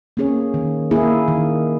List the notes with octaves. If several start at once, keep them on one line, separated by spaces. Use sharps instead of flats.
A#3 C#4 G#4 C#5
D#3
A#3 E4 G#4
D#3